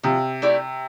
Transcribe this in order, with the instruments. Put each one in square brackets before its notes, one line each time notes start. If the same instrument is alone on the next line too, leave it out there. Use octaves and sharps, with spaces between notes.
[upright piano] C3 [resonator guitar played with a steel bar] F3
[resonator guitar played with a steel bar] A3 E4 G4 D5